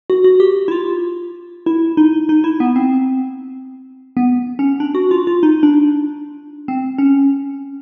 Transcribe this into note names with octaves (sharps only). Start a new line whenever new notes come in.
F#4
F#4
G4
E4
F4
E4
D#4
D#4
E4
B3
C4
B3
C#4
D4
F#4
F4
F4
D#4
D4
C4
C#4